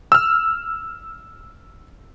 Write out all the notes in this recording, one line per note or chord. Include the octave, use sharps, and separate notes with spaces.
E6 F6